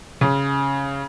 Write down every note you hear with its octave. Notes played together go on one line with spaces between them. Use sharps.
C#3